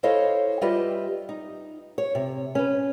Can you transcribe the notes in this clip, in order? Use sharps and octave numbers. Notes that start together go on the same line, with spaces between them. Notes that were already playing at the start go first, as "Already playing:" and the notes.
E4 A4 C5 C#5 D#5 F5
G3 F4 G4 B4 D#5 E5
D#4
C#5
C3
C#4 B4